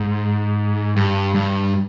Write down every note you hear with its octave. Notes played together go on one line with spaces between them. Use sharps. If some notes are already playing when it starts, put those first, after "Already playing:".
Already playing: G#2
G2
G2